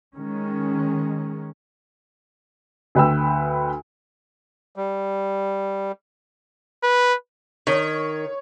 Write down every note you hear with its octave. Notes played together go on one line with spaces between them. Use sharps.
D#3 G#3 C#4
D2 B4 G5 E6
G3
B4
D#3 C#5